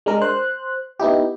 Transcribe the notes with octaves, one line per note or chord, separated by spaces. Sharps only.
G#3 D4 A#4
C5 F#6
B3 D#4 E4 G4